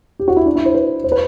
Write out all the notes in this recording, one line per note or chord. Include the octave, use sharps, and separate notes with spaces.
G4
F#4
E4
D4
E4
C5
B4
C5
B4